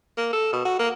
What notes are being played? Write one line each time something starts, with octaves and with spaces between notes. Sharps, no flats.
A#3
A4
B2
F#4
A#3